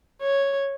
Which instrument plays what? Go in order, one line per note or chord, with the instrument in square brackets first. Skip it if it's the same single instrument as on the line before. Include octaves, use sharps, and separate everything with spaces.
[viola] C#5